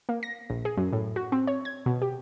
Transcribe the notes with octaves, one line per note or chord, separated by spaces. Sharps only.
A#3
A#6
A#1
G#4
F#2
A2
F#4
C4
C#5
G#6
B2
G4